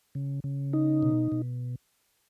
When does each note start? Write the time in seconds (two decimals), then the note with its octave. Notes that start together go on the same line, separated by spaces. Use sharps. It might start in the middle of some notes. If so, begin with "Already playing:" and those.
0.15 C#3
0.44 C#3
0.73 D#4
1.03 B2
1.32 B2